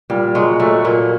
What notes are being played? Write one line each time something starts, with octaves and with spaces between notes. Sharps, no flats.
A#2 G3
F#3 G#3
F#3 A3
A#2 A#3